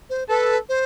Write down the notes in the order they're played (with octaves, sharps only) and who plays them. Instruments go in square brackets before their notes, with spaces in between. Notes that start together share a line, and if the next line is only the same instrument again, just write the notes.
[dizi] C5
[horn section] A4 [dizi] B4
[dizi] C5